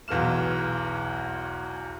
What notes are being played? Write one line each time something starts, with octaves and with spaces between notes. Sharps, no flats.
B1 E2 E3 F5 F6 E7